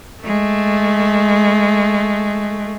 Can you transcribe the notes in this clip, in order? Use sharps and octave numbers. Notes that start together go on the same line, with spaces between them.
G#3 A3